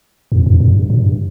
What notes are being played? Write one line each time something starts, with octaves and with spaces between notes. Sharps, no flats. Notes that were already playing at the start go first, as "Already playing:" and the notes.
F2
F2
G2
G2